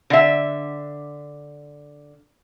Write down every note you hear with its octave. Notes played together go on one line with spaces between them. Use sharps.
D3 E5